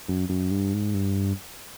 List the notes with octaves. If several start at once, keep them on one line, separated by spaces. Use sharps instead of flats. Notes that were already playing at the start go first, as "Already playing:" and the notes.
F#2
F#2
G2
G#2
G2